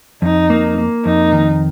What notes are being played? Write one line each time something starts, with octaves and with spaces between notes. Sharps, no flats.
F2 D#4
A#3
A#3
F2 D#4
D#3